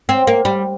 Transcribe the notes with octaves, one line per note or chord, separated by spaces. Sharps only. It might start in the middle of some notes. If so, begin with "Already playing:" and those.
C4
A#3
G3